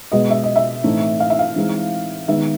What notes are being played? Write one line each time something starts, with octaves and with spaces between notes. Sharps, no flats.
B2 G#3 B3 D#5
E5
D#5
E5
A2 E3 A3 C4 D#4
F5
E5
F5
E3 G#3 C4 D#4
D#3 G#3 B3 D#4 E5